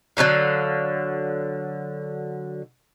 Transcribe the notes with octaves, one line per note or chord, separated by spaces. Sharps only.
D3 F#3 C#4 F5